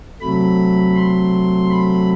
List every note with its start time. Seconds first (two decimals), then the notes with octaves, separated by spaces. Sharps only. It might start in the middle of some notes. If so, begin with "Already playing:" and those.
0.21 C3 F#3 A3 B5
0.96 C6
1.71 B5